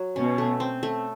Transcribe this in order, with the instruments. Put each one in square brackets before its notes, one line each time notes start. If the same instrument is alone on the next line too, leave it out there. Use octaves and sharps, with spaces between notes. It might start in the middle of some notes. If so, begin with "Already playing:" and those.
Already playing: [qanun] F#3
[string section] B2 [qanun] C#4
[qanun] A3
C4
A3